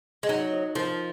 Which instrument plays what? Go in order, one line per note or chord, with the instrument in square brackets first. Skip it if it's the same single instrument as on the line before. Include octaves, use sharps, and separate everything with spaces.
[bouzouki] G#3
[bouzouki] F#3 [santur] D#4
[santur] D#5
[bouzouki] F3 [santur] A#4